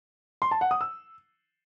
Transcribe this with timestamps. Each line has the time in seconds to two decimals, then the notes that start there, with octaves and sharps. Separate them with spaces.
0.42 C6
0.51 A5
0.61 F#5
0.71 D#6
0.81 E6